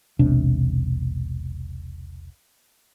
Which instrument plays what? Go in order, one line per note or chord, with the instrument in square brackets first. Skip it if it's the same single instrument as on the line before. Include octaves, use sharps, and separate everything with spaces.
[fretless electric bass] E1 B1 C3 D4